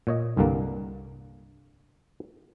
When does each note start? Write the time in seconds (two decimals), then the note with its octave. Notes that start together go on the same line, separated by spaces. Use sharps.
0.07 A#2 C#5 D#5
0.37 C2 G2 D3 A#3